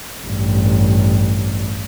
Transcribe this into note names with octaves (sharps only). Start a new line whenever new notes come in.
A1 G2